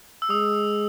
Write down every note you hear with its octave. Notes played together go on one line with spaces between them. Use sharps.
E6
G#3 D#6